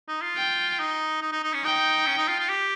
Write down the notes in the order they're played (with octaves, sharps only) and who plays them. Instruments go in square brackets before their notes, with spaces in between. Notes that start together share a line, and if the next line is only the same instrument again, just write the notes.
[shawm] D#4
F4
[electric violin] G5
[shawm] D#4
D#4
D#4
D#4
C#4
[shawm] D#4 [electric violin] G5
[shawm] C#4
D#4
F4
F4
G4